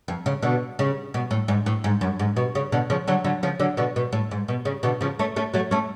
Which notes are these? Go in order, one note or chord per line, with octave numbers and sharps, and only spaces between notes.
F2
C#3
B2 D3
C#3
B2
A2
G#2
A2
G#2
F#2
G#2
B2
C#3
B2 D3
C#3 F3
D3 F#3
D3 F#3
C#3 F3
D3 F#3
B2 D3
B2
A2
G#2
B2
C#3
B2 D3
C#3 F3
A3 C#4
A3 C#4
F#3 A3
A3 C#4